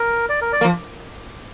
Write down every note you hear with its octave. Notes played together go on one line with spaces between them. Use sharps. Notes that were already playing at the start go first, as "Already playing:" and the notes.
Already playing: A#4
D5
A#4
D5
A#3
F3